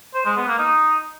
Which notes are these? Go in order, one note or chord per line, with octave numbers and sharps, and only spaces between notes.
C5
G#3
B3
A#3
D#4